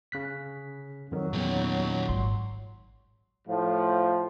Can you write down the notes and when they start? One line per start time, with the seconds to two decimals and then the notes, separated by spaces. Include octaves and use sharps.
0.12 C#3 F#6 B6
1.11 F2 D#3 F#3
1.33 E2 A#2 D#3
2.09 G#1 F4 C6
3.48 A2 F3